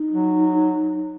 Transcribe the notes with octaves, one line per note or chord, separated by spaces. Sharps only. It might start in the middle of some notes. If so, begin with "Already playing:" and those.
Already playing: D#4
F#3